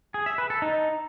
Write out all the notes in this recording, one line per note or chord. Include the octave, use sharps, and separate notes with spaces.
G#4
E5
B4
A4
D#4